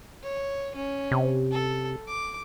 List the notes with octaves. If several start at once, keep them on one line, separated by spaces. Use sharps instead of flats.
C#5
C#4
C3
A4
D6